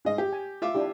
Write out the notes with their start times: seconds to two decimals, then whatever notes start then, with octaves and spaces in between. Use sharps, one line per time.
0.05 G#2 D#5
0.18 G4
0.33 G#5
0.62 F4 E5 D6
0.75 D4 E4 G4